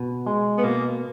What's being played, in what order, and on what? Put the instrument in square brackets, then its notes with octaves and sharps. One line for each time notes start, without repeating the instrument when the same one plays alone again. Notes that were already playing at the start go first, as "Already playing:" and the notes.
Already playing: [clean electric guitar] B2
G#3
[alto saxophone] B3
[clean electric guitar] B2 [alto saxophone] A#3